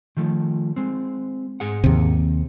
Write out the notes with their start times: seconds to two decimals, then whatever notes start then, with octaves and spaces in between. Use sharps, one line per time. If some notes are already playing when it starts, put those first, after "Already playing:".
0.17 D#3 F3 A3
0.76 G#3 C4
1.60 G#2 G#4 F#5
1.84 D#2 C3